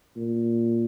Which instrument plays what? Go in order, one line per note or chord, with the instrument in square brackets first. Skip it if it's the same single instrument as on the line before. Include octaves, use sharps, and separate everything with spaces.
[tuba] A#2